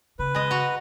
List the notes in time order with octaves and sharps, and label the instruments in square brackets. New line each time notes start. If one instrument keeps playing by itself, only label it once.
[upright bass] C#3 [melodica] B4
[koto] G#3 D#5
F#4 A#5